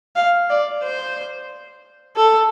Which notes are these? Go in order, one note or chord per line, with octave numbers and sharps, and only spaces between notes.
F5
D5
C5
A4